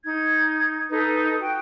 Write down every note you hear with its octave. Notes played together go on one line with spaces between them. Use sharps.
D#4 G#6
D#4 A4 B4
F#4 G5